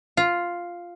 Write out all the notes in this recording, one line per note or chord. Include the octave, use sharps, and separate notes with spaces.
F4